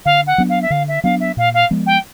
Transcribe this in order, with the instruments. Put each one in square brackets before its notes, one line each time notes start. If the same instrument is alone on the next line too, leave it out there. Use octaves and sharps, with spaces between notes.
[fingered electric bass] D3 [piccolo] F5
[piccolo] F#5
[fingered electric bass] F#3 B3 D4
[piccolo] F5
E5
[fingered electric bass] D3 [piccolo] F5
[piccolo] E5
[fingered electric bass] F#3 B3 D4 [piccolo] F5
[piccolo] E5
[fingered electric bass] A#2 [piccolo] F5
[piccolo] F5
[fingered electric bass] F3 G#3 B3
[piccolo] G5